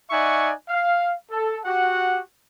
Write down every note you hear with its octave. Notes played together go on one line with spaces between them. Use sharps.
D#4 D5 E5 F#5 G#5 C#6
F5
A4
F#4 G4 F#5